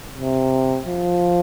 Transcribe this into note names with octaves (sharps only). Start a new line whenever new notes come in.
C3
F3